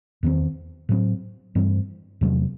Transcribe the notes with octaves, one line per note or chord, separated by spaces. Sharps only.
E2 D#3 A3 C4
A2 F#3 C4
G2 E3 A3 C4
E2 C3 F#3 A3